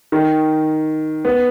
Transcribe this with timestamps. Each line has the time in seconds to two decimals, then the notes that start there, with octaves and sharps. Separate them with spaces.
0.12 D#3
1.25 B3